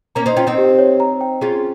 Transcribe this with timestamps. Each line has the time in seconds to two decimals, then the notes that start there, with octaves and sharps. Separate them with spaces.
0.15 A#3 C#4 A#5
0.26 C4 D#4
0.37 C#4 F4 G5
0.47 C4 D#4
0.58 G4
0.78 C#5
1.00 A#5
1.21 G5
1.41 C#4 F4 G#4